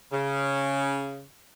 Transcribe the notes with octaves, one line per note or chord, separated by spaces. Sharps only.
C#3